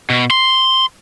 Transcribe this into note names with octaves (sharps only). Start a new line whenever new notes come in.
B2
C6